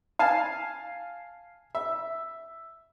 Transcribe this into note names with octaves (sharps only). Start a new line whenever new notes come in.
F5 G#5 A5
E5